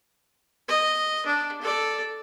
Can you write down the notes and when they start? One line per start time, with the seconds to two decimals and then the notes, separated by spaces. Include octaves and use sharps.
0.68 D#5
1.26 D4
1.62 A4 D5